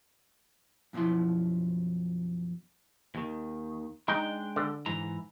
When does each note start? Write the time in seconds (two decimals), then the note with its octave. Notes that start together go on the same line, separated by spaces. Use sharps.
0.93 F#2 B2 F3 E4 C6
3.15 D#2 D#3
4.08 G#3 D4 D#4 G5
4.56 D3
4.86 G#2 E3 A#5